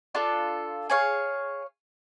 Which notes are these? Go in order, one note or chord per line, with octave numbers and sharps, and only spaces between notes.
D4 F4 A4
G#4 C#5 F5